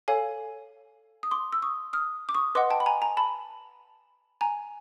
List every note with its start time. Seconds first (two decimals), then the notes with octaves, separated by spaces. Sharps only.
0.08 A4 C#5 F5 G#5
1.23 D#6
1.31 C6 D6
1.53 E6
1.62 C#6 D#6
1.93 D#6 F6
2.29 D6
2.35 C#6 D#6
2.55 B4 D#5 F#5 C6 D6
2.70 G5 A5
2.80 B5
2.86 G#5 A#5
3.02 G#5 A#5
3.17 A5 B5
4.41 G#5 A#5